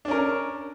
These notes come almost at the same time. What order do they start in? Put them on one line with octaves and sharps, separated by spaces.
D4 C#4 A#4